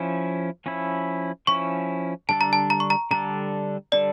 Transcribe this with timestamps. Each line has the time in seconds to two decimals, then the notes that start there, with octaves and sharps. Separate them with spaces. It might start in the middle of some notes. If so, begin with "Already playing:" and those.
Already playing: F3 C#4 E4
0.66 F3 C#4 E4
1.47 F3 C#4 E4 C#6
2.29 D3 G3 D4 A4 A5
2.41 A#5
2.53 A5
2.70 A#5
2.80 C#6
2.90 A#5
3.11 D3 G3 D4 A4 A#5
3.92 D3 G3 D4 A4 D5